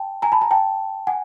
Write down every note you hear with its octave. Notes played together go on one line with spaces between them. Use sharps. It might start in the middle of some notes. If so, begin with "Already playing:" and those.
Already playing: G5 A5
G#5 A#5
A5 B5
G#5 A#5
G5 A5
F#5 G#5